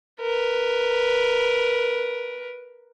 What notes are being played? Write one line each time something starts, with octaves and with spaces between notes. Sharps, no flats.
A#4 B4